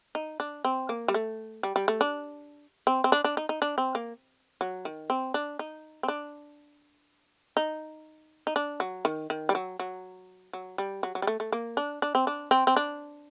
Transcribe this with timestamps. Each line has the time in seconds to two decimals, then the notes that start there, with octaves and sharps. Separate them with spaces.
0.15 D#4
0.40 D4
0.65 C4
0.89 A#3
1.08 G3
1.14 A3
1.63 G3
1.76 G3
1.88 A3
2.01 D4
2.87 C4
3.04 C4
3.12 D4
3.24 D4
3.37 D#4
3.49 D#4
3.62 D4
3.78 C4
3.95 A#3
4.61 F#3
4.85 D#3
5.10 C4
5.34 D4
5.59 D#4
6.03 C4
6.08 D4
7.57 D#4
8.47 D#4
8.56 D4
8.80 F#3
9.05 D#3
9.30 D#3
9.49 G3
9.55 F#3
9.80 F#3
10.53 F#3
10.78 G3
11.03 F#3
11.15 F#3
11.22 G3
11.27 A3
11.40 A3
11.52 A#3
11.77 D4
12.02 D4
12.15 C4
12.27 D4
12.51 C4
12.67 C4
12.76 D4